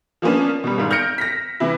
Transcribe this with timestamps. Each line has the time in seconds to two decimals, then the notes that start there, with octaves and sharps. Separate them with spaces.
0.22 F3 A#3 B3 C#4 D4
0.64 B2 G3
0.78 G#1 G#2
0.91 F6 G6 A#6 C#7 D7
1.18 A#6 B6
1.60 C3 E3 E4